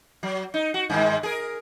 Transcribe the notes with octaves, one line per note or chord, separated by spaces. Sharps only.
F#3
D#4
F#4
G2 D#3 G#3
G#4 A#4